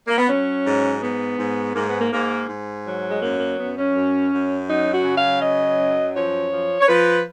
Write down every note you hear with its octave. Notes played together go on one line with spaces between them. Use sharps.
A#3
B3
F#3 C#4
G#2
G#2 B3
G#2
G#2 A#3
B3
A#3
G#2 A#3
G#2
F#3
G#3
F#2 A#3
A#3
F#2 B3
C#4
F#2
F#2
F#3 D#4
F#4
C#3
F5
F#3 D#5
F#2
F3 C#5
F3
C#5
F3 B4